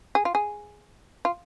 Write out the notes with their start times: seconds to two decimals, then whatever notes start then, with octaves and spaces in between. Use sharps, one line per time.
0.15 G#4
0.25 F4
0.35 G#4
1.25 F4